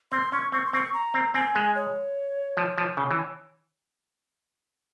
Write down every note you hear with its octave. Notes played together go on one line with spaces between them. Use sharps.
C4 C6
C#4 C#6
C4 C#6
C6
C4 C#6
A#5
C4
C4 G#5
G#3
C#5
F3
F3
C#3
E3